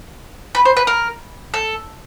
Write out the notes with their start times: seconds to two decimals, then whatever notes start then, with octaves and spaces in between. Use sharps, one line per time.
0.55 B4
0.65 C5
0.77 B4
0.87 A#4
1.54 A4